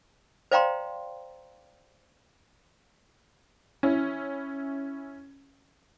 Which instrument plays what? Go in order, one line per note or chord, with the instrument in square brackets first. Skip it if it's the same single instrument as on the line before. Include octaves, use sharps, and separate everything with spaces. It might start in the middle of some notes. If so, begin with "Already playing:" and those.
[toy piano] C5 D5 F5 G5 A#5 C6
[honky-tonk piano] C#4 E4